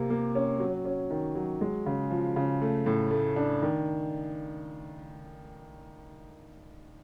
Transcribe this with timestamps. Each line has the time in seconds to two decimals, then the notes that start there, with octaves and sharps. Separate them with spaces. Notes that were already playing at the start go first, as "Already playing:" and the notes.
Already playing: C3 A#3
0.10 A#3
0.35 C#4
0.59 F#3
0.85 C#4
1.11 D#3
1.35 F#3
1.61 G#3
1.86 C#3
2.11 F3
2.36 C#3
2.62 A3
2.86 A2
3.11 A3
3.36 D4
3.62 D#3